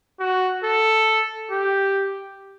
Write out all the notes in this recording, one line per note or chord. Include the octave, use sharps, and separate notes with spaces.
F#4
A4
G4